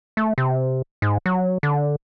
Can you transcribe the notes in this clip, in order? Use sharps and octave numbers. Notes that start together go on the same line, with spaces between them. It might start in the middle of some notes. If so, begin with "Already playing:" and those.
A3
C3
G#2
F#3
D3